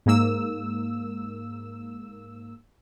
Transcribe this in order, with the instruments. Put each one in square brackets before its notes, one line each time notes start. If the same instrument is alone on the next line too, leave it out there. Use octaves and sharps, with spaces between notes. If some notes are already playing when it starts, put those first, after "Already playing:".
[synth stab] G#2 A#3 E6